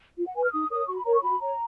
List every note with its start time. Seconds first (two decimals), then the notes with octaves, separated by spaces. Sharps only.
0.18 F4
0.27 F#5
0.36 B4 G#5
0.44 F6
0.52 D#4 D#6
0.71 A#4 C#5 D#6
0.88 F#4 C#6
0.97 B5
1.05 A#4 C#5 A#5
1.14 C#6
1.22 F#4 B5
1.40 C#5 A#5